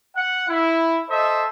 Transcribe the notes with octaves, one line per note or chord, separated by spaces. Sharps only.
F#5
E4
A4 C5 D#5 E5